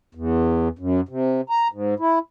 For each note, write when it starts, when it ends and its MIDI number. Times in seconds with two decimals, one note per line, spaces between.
0.15 0.68 40
0.79 1.01 42
1.09 1.41 48
1.49 1.68 82
1.72 1.94 44
2.00 2.19 64